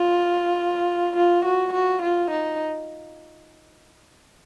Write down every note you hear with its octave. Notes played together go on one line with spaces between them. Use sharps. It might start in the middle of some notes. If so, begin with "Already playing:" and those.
Already playing: F4
F4
F#4
F#4
F4
D#4